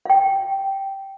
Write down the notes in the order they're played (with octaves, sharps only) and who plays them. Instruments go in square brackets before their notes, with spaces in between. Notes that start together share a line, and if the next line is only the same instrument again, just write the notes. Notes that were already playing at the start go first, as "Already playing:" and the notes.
[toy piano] F5 G5